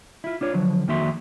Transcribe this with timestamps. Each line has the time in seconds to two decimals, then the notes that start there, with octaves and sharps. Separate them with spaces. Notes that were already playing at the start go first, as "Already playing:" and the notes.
0.24 E4 F4
0.41 D4 F4 C#5
0.54 D3 F3 F#3
0.88 F2 D#3 A#3 F#4 E5 C6